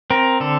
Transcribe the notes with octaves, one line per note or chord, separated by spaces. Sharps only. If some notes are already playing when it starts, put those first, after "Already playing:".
C4 A#4
D3 A4